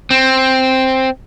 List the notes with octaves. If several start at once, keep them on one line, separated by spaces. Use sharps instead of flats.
C4